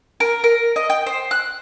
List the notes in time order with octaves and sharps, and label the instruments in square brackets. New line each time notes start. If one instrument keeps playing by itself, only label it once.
[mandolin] A#4
A#4
D#5
G5
C5
F#6